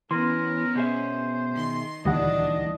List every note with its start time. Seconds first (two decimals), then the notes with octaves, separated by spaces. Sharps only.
0.11 E3 B3 C#4 A#4 C6
0.75 B2 G#4 C5 E5
1.55 D#3 C6
2.05 D2 A#2 D#3 E3 G3 D4 D#5 F#5